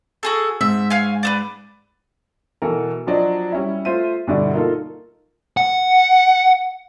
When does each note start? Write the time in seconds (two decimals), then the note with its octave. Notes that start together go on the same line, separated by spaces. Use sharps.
0.23 F#4 G#4 A4
0.61 G#2 E5
0.90 C#5 F5 G#5
1.23 B4 C5 D5
2.62 B2 E3 A4 A#4
3.07 F3 F#3 D4 D#5
3.52 G3 C#4 E4
3.85 A3 F4 C5 E5 D#7
4.27 G2 B2 D3 D4 E4
4.54 A#3 D#4 F4 A4
5.57 F#5